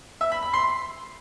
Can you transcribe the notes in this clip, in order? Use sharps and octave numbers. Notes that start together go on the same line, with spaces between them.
E5
B5
B5
C6